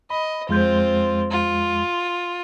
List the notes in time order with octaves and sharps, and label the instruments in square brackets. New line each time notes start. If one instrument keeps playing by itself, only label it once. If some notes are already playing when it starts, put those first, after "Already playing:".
[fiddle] D#5 [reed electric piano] B5
[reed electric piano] F2 G#3 G6 [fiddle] C4 F4
[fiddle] F4